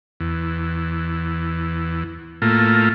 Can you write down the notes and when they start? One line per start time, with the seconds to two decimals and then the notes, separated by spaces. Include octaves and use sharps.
0.20 E2
2.42 A2 A3 A#3 F4